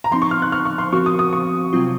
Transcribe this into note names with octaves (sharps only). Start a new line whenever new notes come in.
A#5
F3 C4 D#4 C6
C#6
F6
F#6
F6
C#6
C6
F3 C4 F#4 A#4 C#6
D#6
D#6
C#6
C3 F#3 C4 F4